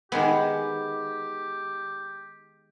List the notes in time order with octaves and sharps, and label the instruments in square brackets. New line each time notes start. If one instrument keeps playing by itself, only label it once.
[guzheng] D#3 G#3 B3 [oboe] G4